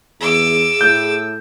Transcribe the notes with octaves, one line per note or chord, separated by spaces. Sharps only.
E2 G#4 D6 E6
A2 G6